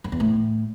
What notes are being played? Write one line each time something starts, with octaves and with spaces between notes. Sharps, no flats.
F#2
E2
A2